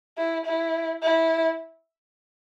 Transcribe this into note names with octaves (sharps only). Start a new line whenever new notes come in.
E4
E4
E4